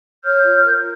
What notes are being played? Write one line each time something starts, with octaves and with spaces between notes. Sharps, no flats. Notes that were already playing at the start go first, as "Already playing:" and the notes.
C#5 F6 G6
F4
A#4